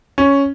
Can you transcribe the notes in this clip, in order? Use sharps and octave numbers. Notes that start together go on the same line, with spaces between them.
C#4